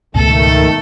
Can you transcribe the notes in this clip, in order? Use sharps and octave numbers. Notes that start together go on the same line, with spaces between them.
C#2 G#2 B2 D#3 A3 A4